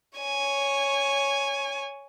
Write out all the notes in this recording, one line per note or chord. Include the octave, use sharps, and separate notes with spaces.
C#5 G#5